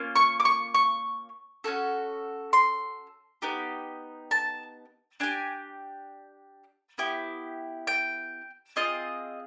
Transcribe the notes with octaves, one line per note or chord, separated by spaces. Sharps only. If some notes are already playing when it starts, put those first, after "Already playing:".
Already playing: A#3 C#4 F4
C#6
D6
C#6
C#6
C#4 F#4 A4
C6
B3 D#4 G4
A5
D4 G4 G#5
B3 E4 G4
G5
C4 F4 G#4 D#5